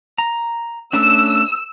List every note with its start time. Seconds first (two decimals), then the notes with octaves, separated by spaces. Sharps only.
0.18 A#5
0.93 A3 C#4 D4 E6